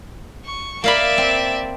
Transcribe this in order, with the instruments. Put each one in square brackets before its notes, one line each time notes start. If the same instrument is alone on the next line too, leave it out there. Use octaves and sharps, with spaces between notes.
[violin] C#6
[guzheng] A#3 F5 B5 [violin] D5 E5
[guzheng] C4